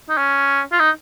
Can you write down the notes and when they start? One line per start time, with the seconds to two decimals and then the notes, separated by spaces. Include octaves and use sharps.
0.09 D#4
0.18 C#4
0.72 F4
0.79 D#4